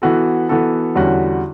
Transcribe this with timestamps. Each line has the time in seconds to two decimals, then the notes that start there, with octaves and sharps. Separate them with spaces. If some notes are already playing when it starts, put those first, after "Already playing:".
0.02 E3 B3 F#4 A4
0.49 E3 B3 F#4 A4
0.95 E2 D3 G3 C#4 F#4